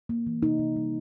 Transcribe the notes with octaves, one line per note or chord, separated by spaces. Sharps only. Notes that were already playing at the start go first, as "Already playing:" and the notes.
A#3
E3
C3 D#4
C3
G3